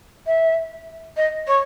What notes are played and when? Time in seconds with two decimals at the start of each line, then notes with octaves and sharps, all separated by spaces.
0.26 E5
1.17 D#5
1.47 C#5